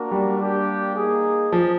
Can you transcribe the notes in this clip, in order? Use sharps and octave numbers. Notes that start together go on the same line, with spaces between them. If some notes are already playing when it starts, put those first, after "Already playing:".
Already playing: A#3 D4 F#4 A#4
G3
A#3 D4 G4
A#3 D#4 G#4
F3